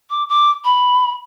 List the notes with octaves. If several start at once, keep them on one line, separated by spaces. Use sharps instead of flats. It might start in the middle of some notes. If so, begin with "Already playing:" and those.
D6
D6
B5